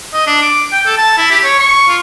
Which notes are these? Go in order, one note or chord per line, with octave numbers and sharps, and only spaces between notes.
D#5
D4
D6
G5
A4
A5
E4
G4
C#5
C#6
F4